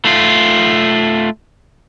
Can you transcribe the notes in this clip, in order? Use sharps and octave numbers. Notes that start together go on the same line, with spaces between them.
A3 F4